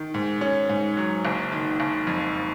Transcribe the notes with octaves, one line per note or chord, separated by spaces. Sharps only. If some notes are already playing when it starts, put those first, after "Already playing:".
Already playing: D#3
G#2
C#4
G#2
F#3
F#1
D#3
F#1
F2